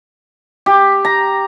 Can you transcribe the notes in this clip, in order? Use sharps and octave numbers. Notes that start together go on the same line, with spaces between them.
G4
A#5